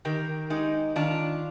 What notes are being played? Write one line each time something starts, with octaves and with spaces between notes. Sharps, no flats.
D#3 G4 A#4
G#3 D#4 G4
D#3 D4 F4